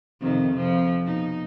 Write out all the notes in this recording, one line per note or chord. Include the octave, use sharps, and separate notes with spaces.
F2 C3 D#3
F2 F3
B2 D#4